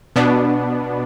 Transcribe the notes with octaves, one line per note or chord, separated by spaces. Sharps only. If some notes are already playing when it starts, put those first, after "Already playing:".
B2 B3 D4